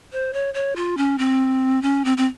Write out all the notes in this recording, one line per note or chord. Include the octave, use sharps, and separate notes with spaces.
C5
C#5
C#5
F4
C#4
C4
C#4
C4
C4